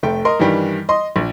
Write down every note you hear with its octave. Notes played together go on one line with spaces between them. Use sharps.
F1 A3 G5
A#4 D#5 C6
G2 D#3 E3 G3
D#5 C6
A#1